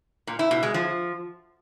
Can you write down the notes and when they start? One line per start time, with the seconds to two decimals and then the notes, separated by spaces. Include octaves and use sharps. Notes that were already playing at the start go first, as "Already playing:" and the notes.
0.27 A#2
0.39 E4
0.51 B2
0.63 G#3
0.74 F3